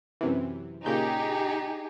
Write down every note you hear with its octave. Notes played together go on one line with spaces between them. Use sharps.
F#2 C3 E3
A#2 C#3 D#4 G4 G#4 G6